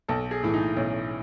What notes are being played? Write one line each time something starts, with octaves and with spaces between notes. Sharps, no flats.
B1 A4
G#4
A2 E3
D#4
B1 C#4